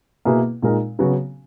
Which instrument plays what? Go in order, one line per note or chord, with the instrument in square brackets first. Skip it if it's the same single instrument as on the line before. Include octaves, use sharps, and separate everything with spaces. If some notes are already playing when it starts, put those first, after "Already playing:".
[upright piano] B2 A#3 E4 G#4 B4
A#2 G#3 D#4 A#4
C#3 F#3 B3 F#4